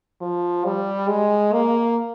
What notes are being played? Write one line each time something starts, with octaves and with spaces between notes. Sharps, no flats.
F3
G3
G#3
A#3